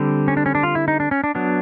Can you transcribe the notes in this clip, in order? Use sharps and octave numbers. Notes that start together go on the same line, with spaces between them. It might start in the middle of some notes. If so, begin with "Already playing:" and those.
Already playing: D3 G3 C4
C#4
D4
C#4
D4
F4
E4
D#4
D4
C#4
D4
F#3 B3 D4